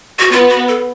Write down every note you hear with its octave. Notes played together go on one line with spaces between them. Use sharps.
F#4
B3 F4
F#4
A4